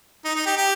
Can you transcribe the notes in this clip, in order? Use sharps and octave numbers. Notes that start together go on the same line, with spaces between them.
D#4
D#4
G4
G4